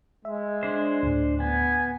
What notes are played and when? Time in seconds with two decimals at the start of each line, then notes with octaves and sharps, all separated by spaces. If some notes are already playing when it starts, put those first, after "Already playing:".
0.25 G#3 E5
0.63 D4 C5
1.03 D2 A2
1.40 B3 G#5